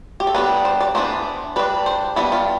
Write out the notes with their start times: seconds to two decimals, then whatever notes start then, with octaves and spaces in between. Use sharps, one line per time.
0.20 G4
0.27 A4
0.35 G3 B3 D4 B4
0.65 C5
0.80 D5
0.95 E3 B3 D4 C5
1.56 G3 D4 B4
1.86 C5
2.16 G3 B3 D4 E4
2.32 F4